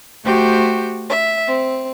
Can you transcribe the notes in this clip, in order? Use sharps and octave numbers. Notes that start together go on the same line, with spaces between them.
A3 F#4 G4 C5 G5
E5
C4